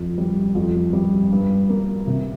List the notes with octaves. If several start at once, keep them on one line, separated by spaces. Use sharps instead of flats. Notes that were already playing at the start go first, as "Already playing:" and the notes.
Already playing: F2
G3
F2
G3
G2
A#3
C3